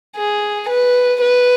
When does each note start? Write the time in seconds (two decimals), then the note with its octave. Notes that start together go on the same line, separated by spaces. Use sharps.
0.16 G#4
0.69 B4
1.21 B4